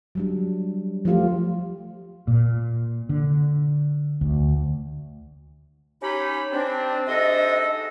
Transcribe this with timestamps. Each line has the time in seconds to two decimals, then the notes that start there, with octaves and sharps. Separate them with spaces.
0.15 F#3 G3 D4
1.05 F3 A3 F4 G4
2.28 A#2
3.09 D3
4.21 D2
6.02 C#4 D#4 G4 B5
6.52 C4 D4
7.07 G#2 C3 D4 A4 D#5